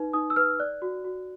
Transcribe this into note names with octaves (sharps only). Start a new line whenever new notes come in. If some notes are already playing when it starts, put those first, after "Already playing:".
Already playing: D#4 B4
D#4 D#6
E6
B4 F6
D5 F#6
F#4
F#4